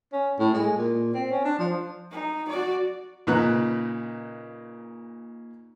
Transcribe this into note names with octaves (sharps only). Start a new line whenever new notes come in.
C#4
A2
G#3
A#2
C4
C#4
D4
F3
D#4
F#4 D5
A#2 C#3 D#4 B4 A#5 F#6